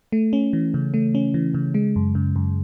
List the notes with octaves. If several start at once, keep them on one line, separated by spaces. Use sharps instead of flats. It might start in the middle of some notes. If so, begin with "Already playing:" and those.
A3
C#4
E3
C#3
A3
C#4
E3
C#3
G#3
F#2
C#3
F#2